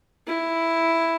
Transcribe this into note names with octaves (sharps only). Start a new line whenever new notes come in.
E4